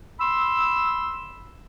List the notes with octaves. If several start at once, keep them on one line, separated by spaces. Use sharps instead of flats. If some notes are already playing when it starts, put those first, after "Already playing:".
B5 C6 E6